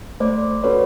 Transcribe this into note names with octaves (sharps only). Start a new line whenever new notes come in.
A3 C5 D5
C#4 F#4 A4 B4 C#5